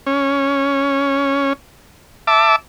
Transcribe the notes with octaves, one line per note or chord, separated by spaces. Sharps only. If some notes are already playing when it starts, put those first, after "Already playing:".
C#4
E5 A5 D6